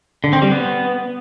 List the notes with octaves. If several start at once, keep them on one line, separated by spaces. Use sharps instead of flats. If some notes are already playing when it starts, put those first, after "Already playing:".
D3
C4
G3
B3